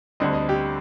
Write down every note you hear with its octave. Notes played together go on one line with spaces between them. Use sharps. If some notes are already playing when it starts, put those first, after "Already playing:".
D2 D3 G3 C4 D#5
D#5
G4